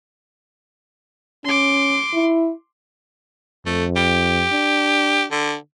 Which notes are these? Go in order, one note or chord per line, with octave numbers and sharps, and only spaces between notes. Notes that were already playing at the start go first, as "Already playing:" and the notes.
C#4 C6 D6
E4
F2 A3
G4
D4
D3